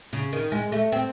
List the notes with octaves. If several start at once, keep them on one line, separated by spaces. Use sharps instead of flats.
C#3
D#3
G#3
A3
C4